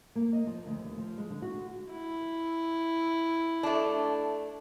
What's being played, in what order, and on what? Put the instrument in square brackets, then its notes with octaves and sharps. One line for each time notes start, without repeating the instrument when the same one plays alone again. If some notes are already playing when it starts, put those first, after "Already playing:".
[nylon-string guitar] A#3
D#5
F3
D2
D#2
F3
G#3
D3
F#4
[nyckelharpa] E4
[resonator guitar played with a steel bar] A3 D4